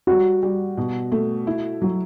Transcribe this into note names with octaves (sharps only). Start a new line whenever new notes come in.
G3 F#4
G3
B2
A3
E4
F#3